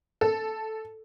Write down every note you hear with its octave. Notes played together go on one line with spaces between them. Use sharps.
A4